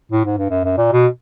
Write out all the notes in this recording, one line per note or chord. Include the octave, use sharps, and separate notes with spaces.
A2
G#2
G2
F#2
F#2
A#2
B2